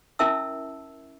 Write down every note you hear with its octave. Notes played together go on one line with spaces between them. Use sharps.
C#4 E4 A#4 E5 A5 E6